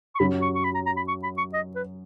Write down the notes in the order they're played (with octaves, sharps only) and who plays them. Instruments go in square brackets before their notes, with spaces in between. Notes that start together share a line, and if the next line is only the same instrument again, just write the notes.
[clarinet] C#6
[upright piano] F#2 F#3 [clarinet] B5
[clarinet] C#6
C#6
B5
A#5
A#5
B5
C#6
B5
C#6
D#5
B4